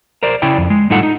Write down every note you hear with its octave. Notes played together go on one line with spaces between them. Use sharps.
A#4 C5 D5
C#3 E4 D5 G5
F2
G#3
A2 G3 D#4 F4 A4 F#5
D#4